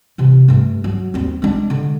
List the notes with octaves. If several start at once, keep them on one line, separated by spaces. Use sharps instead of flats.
C3 E3
G2 A3
F#3
D#2 C4
G#3 D4
D3